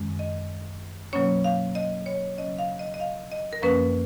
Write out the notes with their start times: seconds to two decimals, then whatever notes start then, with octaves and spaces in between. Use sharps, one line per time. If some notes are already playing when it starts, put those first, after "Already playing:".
Already playing: F#2 D#3 G#3 C#4
0.19 D#5
1.13 B2 F#3 A#3 C#4 C#5
1.44 F5
1.75 D#5
2.06 C#5
2.37 C#3 F#3 C#4 D#5
2.59 F5
2.79 D#5
2.94 D#5
3.00 F5
3.32 D#5
3.53 A#4
3.62 F#2 F3 A#3 C#4 B4